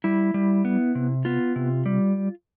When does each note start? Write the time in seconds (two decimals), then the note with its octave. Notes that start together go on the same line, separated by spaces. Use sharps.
0.04 G3 E4
0.34 G3
0.65 B3
0.95 C3
1.25 B3 F4
1.56 C3
1.86 G3